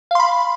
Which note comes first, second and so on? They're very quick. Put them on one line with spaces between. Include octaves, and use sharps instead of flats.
F5 C6 B5